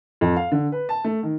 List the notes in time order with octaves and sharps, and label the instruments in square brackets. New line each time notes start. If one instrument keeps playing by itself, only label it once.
[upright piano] F2
F5
D3
B4
A5
A3
D#3